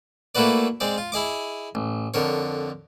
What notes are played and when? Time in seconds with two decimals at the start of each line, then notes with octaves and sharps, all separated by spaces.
0.35 A3 A#3 E4 F#4 B4 D5
0.80 G#3 C4 D5
0.98 F4
1.12 E4 G#4 D#5 D6
1.75 A1
2.14 F2 D3 A#4 C#5